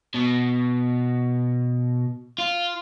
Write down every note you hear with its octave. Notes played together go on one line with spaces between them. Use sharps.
B2
F4